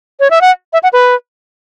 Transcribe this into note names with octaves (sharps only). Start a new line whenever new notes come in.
C#5
E5
F#5
E5
F#5
B4